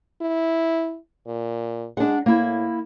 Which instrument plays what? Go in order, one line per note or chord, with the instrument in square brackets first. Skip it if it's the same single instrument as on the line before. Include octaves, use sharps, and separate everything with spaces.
[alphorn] E4
A#2
[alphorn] G#3 [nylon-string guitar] D4 F#5
[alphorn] A2 [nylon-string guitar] A#3 E4